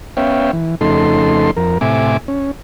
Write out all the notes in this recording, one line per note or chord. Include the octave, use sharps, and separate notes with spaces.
B3 C#4 C#5 E5 F5 G5
E3
F2 C#3 A3 D#4 A4 C6
F2 A#4
A2 C3 E5 G#5 D6
C#4